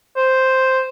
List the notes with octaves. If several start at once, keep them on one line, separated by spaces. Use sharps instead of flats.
C5